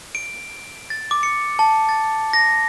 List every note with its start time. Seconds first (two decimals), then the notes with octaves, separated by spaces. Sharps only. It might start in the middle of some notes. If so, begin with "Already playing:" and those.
0.15 D7
0.90 A6
1.11 D6
1.23 C#7
1.59 A5
1.89 A6
2.33 A#6